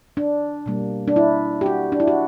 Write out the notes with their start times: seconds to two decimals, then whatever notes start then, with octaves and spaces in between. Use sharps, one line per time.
0.17 D4
0.66 B2 G3 A#3
1.08 D4
1.16 E4
1.61 G4
1.66 F#4
1.92 D4
2.00 E4
2.08 F#4